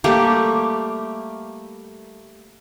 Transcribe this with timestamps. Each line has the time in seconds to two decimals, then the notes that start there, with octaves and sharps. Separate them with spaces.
0.04 G3 A3 A#3 G4